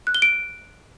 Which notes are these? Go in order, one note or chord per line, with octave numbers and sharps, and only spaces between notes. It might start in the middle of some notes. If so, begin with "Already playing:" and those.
F#6
G7
D7